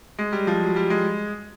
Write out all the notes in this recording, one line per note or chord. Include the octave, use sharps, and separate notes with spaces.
G#3
G3
F3
F#3
G3
G#3